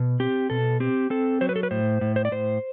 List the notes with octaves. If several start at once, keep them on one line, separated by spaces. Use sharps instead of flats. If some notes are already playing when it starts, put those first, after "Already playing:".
Already playing: B2
C4 G4
B2 A4
C4 G4
C4 A4
F#3 C5
B4
A4
B4
A2 C5
A2
C5
D5
A2 C5